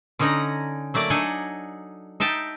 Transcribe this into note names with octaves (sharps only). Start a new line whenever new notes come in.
D3 C#4 D#4 D#5 F#5 A#5
F#3 A3 A#3 D5
D4 D#4 A4 D#5 F#5 G#5
D#4 E5 G5 A5